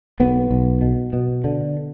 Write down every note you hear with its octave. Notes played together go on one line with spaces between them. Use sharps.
B1 B3
B1
B2
B2
D3